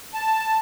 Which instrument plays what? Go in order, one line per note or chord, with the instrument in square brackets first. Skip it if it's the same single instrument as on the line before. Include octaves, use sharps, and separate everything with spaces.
[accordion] A5